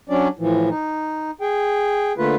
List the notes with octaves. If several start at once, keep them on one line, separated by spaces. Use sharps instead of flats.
F#3 C#4 D4 D5
A2 E3 F3
D#4
G#4 G5
D3 A3 A#3 F4 B4